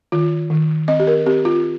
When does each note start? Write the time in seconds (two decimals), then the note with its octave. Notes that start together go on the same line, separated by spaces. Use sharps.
0.12 D#3 F4
0.50 D#3
0.88 C4 D#5
1.00 G4
1.07 A#4
1.26 C4 G4
1.45 F4